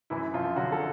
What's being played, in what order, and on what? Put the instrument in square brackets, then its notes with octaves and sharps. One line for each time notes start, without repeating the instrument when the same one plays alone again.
[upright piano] F#2 E3 E4
F#2 F3 F4
D3 F#3 F#4
A4